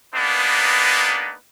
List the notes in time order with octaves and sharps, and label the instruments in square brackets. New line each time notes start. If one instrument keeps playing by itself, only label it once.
[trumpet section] A#3 B3 D4 D#4 G#4 B4